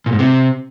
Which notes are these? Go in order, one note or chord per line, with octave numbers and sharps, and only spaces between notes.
A#2
G#2
C3